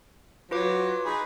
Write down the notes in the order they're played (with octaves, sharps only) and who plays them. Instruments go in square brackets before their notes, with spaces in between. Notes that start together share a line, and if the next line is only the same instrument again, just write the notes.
[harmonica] F#3 [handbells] F4 B4 D6
[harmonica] D#4 G#4 B4